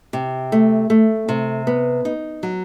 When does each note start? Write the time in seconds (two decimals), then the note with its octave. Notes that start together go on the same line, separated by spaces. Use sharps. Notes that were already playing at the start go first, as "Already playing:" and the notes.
0.13 C3
0.52 A3
0.90 A3
1.29 C3
1.67 B3
2.05 D#4
2.43 F#3